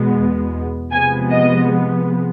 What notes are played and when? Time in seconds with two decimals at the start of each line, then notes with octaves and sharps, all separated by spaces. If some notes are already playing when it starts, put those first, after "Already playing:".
Already playing: E2 B2 G#3 B3
0.92 C3 F3 G#3 B3 G#5
1.32 D#5